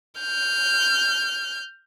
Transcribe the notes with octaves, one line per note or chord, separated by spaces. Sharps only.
F6 G6